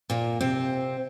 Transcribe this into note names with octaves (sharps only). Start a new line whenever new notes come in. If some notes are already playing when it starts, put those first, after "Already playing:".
A#2 A#3
C3 C4